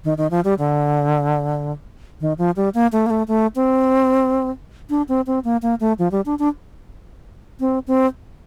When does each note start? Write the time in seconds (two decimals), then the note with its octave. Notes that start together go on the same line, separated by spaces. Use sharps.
0.04 D#3
0.18 D#3
0.31 F3
0.45 G3
0.59 D3
2.21 D#3
2.38 F3
2.56 G3
2.74 A#3
2.92 A3
3.06 A#3
3.10 A3
3.28 A3
3.56 C4
4.90 D4
5.08 C4
5.27 C4
5.44 A#3
5.62 A#3
5.80 A3
5.99 F3
6.12 G3
6.26 D4
6.39 D4
7.60 C4
7.88 C4